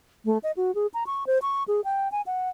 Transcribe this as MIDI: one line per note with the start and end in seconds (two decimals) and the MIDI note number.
0.25 0.38 57
0.43 0.52 75
0.57 0.74 66
0.75 0.87 68
0.94 1.04 82
1.07 1.26 85
1.27 1.39 72
1.42 1.64 85
1.68 1.81 68
1.84 2.11 79
2.12 2.22 80
2.26 2.49 78